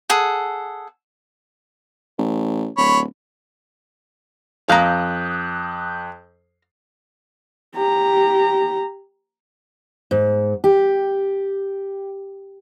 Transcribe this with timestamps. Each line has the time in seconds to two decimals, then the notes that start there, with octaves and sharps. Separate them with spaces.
0.10 G#4 A4 F#5
2.18 A1
2.78 D1 C#5 B5
4.69 F2 F5 A#5 D#6 F#6 G6
7.75 G4 A#5
10.11 G#2
10.64 G4